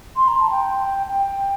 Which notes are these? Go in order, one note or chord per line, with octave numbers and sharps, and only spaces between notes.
C6
A#5
A5
G5
G5